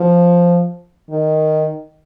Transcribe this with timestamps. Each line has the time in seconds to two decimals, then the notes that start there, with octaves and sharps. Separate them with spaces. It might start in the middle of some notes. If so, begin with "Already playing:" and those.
Already playing: F3
1.11 D#3